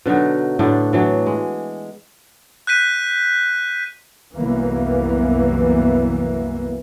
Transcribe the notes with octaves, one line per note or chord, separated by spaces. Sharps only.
B2 D3 F#3 D#4
A2 D3 B3 D4
E3 F#3 D4
G#3
F#6 G6 B6 D#7
C2 F#2 E3 A#3 B3